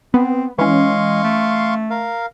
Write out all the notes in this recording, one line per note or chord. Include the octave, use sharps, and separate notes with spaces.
B3 C4
E3 G#3 C#4 F5 C6 C#6
A3
A#4 F5